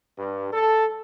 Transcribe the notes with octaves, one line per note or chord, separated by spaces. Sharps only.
G2
A4